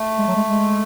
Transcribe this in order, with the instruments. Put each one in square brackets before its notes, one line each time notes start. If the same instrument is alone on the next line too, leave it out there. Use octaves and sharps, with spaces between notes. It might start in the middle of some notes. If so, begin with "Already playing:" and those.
Already playing: [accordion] A3
[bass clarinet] G#3
F#3
G#3
G#3